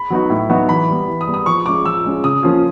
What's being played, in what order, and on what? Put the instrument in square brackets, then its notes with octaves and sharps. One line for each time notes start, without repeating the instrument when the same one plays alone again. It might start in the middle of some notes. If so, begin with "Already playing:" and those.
Already playing: [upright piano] B5
[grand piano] F#3 B3 D#4 F#4
A2
F#3 B3 D#4 F#4
[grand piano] E3 [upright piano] B5
[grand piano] G3 B3
E3
[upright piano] D#6
[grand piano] G3 B3
[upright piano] D#6
[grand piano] F3 [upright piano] C#6
[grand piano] G#3 C#4 F4 [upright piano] D6
[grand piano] F3 [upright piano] E6
[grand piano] G#3 C#4 F4
[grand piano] C#3 [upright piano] D#6
[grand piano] F3 A#3 C#4 F4